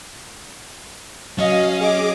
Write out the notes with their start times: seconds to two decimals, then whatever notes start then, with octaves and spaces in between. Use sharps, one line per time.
1.39 F#3 C#4 D#5 F5
1.81 G#4 D#5 D6